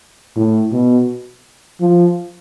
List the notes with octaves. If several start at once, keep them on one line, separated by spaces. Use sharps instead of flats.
A2
B2
F3